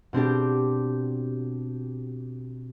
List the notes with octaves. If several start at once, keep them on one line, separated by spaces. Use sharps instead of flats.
B2 C4 D4 G4